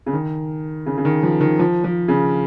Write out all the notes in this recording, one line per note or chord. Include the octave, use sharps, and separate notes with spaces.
C#3
D#3
C#3
C#3
D#3
F3
D#3
F3
F3
C#3